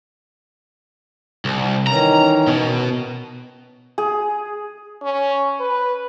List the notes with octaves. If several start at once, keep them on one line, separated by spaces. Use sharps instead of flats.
C2
D#3 E3 C#4 A#5
B2
G#4
C#4
B4